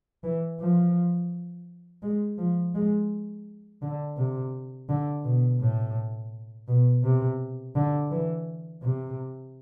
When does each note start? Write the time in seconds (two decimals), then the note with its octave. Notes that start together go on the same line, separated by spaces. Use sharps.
0.24 E3
0.60 F3
2.02 G#3
2.38 F3
2.74 G#3
3.82 D3
4.17 C3
4.89 D3
5.24 B2
5.60 A2
6.68 B2
7.04 C3
7.75 D3
8.11 E3
8.82 C3